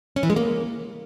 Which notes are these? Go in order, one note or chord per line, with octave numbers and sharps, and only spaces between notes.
C#4
E3
G#3
A#3